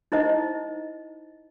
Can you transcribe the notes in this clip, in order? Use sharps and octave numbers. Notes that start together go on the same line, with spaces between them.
D#4 E4 C5 D#5